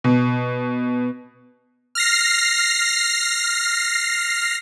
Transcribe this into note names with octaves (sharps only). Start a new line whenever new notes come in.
B2
F6 A#6 C7